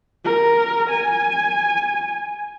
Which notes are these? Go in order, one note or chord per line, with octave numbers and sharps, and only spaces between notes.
A#4
G#5